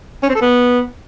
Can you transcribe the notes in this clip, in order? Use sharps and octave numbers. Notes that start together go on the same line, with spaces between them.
C#4
C4
A4
B3